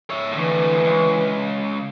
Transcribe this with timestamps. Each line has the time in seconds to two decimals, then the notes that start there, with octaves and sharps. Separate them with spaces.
0.10 C#5 E5
0.32 A2 D3 E3
0.84 C#2